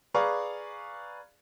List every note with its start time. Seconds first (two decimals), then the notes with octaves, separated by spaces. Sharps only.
0.14 G#4 B4 D5 F5 A#5 C#6